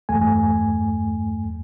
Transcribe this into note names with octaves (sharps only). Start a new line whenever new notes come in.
E2 G2 A3 G#5